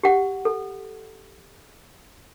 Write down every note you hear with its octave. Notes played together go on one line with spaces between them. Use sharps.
G4 F#5
A4